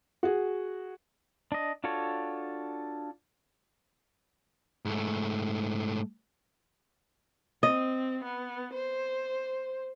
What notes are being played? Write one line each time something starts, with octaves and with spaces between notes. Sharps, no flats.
F#4 G#4
D4 D#5
D4 F4 F#4 A4 C#5
G#2 A3
C4 D#5
B3
C5